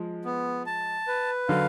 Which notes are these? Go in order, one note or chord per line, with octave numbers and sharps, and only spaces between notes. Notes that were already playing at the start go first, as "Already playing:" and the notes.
Already playing: F3 G#3
B3
A5
B4
D3 F#3 F5